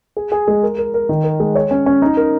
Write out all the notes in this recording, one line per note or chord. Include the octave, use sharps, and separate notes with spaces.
G#4
G#4
G#3
A#4
A#4
A#4
D#3
A#4
G#3
C#5
C#4
C#4
D#4
A#4